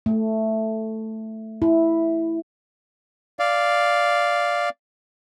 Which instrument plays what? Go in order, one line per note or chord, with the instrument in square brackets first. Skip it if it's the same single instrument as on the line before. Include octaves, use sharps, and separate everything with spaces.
[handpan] A3
E4
[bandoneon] D5 F5